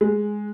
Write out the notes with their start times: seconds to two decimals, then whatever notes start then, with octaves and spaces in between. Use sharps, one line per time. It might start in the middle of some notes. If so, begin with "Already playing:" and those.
0.01 G#3